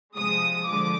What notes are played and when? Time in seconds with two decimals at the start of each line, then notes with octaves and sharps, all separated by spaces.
0.17 C3 F3 G#3 D#6
0.67 D3 F3 G#3 D6